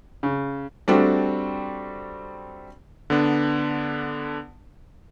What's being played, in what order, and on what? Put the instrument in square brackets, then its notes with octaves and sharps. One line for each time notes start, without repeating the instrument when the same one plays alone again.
[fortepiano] C#3
[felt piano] G3 A3 C4 D4 F#4
[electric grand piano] D3 B3 D4